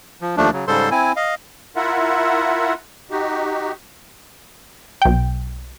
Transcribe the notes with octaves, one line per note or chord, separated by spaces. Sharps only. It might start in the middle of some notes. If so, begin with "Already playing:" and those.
F3
D#2 F3 A3 D4
C#3 F#3
G#2 C#3 G3 A4 C5 C6
C4 E4 G#5
D#5 F5
E4 F4 A#4 E5 F#5
D#4 F#4 G4
B1 G5